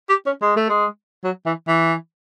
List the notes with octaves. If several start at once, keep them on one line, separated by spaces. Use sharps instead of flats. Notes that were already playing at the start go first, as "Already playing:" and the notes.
G4
C#4
G#3
A3
G#3
F#3
E3
E3